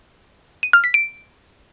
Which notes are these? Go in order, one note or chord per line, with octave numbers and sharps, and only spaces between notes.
D#7
F6
B6
D7